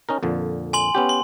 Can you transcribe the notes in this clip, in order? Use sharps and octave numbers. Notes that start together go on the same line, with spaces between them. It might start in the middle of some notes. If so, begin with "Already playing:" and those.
C#4 D#4 A#4
F2 A#2 D3
G#5 C6 F#7
B3 C#4 G4
C6